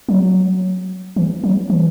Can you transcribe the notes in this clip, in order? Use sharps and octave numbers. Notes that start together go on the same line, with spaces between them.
F#3
E3
F#3
E3